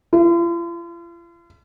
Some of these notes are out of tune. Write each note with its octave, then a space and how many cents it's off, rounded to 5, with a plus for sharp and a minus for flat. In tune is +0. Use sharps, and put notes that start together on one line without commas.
F4 -45